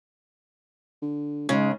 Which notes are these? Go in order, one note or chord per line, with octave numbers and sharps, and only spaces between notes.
D3
G#2 C#3 G#3 C#4